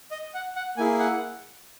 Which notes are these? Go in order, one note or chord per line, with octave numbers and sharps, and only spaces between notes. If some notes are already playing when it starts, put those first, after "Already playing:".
D#5
F#5
F#5
A#3 E4 G#4 G#5
F#5